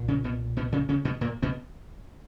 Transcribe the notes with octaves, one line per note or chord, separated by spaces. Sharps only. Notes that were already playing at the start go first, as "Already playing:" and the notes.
Already playing: B1 A#2
C#3 C#4
B2 B3
B2 B3
C#3 C#4
C#3 C#4
B2 B3
A#2 A#3
B2 B3